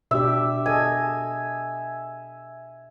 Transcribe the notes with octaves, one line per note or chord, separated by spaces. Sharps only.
B2 D4 G4 E5
G#4 A4 D#5 G#5